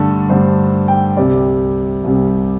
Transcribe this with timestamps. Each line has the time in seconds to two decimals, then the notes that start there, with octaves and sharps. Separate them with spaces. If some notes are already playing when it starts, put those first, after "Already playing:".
Already playing: G2 D3 A3 A4
0.29 G2 D3 A3 C5
0.88 G5
1.17 C2 C3 G3 D5
2.04 C2 C3 G3